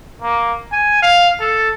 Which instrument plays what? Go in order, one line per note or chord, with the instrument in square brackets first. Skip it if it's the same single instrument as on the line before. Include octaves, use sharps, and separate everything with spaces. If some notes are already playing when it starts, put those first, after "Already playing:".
[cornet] A#3
G#5
F5
A4